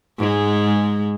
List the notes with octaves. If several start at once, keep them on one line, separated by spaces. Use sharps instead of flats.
G#2 G#3